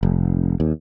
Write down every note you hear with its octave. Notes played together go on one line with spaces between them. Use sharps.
F1
D#2